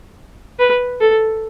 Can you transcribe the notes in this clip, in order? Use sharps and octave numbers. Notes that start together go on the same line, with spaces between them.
B4
A4